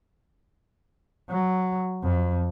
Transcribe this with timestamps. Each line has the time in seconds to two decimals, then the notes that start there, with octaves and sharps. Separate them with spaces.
1.30 F#3
2.03 F2